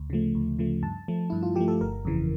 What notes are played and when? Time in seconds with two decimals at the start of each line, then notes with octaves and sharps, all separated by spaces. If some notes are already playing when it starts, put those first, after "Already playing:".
Already playing: D2
0.10 C#3 F3 A3
0.35 D2
0.59 C#3 F3 A3
0.83 G2 A5
1.08 F3 A3
1.30 G2 E4
1.43 F4
1.56 F3 A3 G4
1.68 A4
1.81 G1 A#4
2.05 F2 C#3 E3